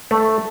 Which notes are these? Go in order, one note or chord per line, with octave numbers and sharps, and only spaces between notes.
A3